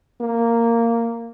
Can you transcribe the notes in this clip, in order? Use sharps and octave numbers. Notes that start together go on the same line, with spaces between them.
A#3